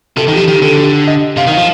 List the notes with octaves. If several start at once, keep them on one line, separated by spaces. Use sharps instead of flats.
C3 A4
D#3
G4
F3
D#3 G4
D3 A4
G4
D#5
C3 F5
D#3 F5
F3